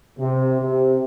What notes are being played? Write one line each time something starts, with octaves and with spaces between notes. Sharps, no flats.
C3
C3